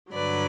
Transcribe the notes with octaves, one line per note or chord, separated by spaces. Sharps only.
G2 D3 F#3 B4 D5